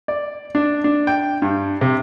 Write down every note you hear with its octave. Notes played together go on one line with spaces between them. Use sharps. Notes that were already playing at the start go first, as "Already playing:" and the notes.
D5
D4
D4
G5
G2
C3